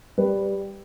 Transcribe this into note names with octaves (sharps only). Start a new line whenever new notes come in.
G3 B4